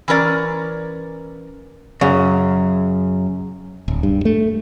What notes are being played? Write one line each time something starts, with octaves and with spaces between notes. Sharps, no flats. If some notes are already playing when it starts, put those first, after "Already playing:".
E3 C#4 A#4 D5
F#2 C#3
D1
G2
A3